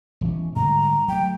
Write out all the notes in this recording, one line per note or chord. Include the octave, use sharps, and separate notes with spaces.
E1 E3 C#4
G#2 D3 G3 A#5
F#3 A3 G5